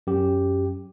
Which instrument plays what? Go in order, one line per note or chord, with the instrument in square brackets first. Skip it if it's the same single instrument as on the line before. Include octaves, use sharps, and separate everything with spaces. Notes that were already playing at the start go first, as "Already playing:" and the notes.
[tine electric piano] F#2 G4